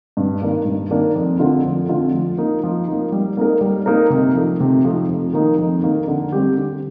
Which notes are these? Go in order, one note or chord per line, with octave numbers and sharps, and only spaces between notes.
G2
D#3 A#3 D4
G2
D#3 A#3 D4
F2
D3 A3 C4 F4
F2
D3 A3 C4 F4
F3
A#3 D#4
F3
A#3 D#4
G3
A#3 D#4 A#4
G3
A#3 D#4 A#4
C3
F3 A3 D#4
C3
F3 A3 D#4
F2
D#3 A#3 D#4
F2
D#3 A#3 D#4
D3
G3 C4 G4
D3